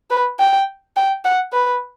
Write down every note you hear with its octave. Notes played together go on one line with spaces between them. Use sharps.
B4
G5
G5
F#5
B4